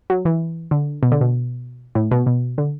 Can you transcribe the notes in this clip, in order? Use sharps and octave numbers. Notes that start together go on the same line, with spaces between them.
F#3
E3
D3
B2
D3
B2
A2
B2
B2
D3